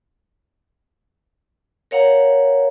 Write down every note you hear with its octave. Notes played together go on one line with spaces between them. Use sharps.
A#4 C#5 F5 F#5 A#5